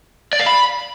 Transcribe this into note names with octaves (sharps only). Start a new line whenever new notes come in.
D5
F5
B5